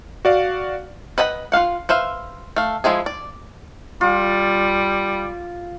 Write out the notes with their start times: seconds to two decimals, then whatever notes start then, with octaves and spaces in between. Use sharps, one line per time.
0.25 F#4 D5 F5
1.18 B4 D#5 F#5 G#5 B5
1.52 F4 F#4 F5 F#5
1.89 B4 C5 E5 F5
2.56 A3 F5
2.84 F3 G#3 E4 G#4
3.06 D5
4.01 G3 F4